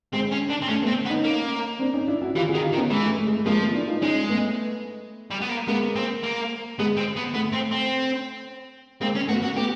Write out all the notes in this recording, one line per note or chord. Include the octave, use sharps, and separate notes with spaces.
G#3 C4
C#4
D4
C4
A3 C#4
A3 B3
C4
B3
C#4 D#4
A#3
C4 D4
C#4 D#4
D4 E4
E4 F#4
E3 F4 G4
F#4 G#4
D#3
F4 G4
D#3
B3 C#4
E3 G#3
A3
A3
G#3
A3
F3 G#3 A#3
A3 B3
D4 E4
D#4 F4
G#3 C#4 D#4
A3 B3
G3
B3
A#3
G#3 A#3 B3
C4
A#3
G#3 B3
C4
B3
A3 B3
C4
C4
G#3 A#3 C4
C#4
A3 B3 F#4
F#4
A3 B3 G4